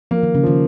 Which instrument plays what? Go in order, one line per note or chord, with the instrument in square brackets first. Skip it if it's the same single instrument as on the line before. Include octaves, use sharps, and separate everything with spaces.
[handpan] F3 [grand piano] A#3
[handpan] D#3
C#3
[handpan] D#3 [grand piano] F3